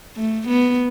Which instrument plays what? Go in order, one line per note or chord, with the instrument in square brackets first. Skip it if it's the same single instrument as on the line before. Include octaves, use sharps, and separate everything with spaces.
[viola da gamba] A3
B3